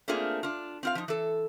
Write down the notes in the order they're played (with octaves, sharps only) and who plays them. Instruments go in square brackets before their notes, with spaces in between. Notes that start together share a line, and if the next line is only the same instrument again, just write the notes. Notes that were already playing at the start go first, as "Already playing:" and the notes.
[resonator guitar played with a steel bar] A3 A#3 C4 D4 F4 G#4
D4 F4
C4 F4 F5
F3 D#4
E3 A4